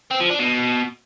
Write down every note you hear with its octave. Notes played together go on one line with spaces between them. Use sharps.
C4
F3
D4
B2